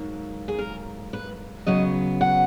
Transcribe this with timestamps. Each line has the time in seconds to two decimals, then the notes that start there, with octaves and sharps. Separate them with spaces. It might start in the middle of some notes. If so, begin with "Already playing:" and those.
Already playing: G#2 F#3 A#3
0.48 G#4
0.59 A#4
1.13 B4
1.67 C#3 F#3 B3 D#5
2.21 F#5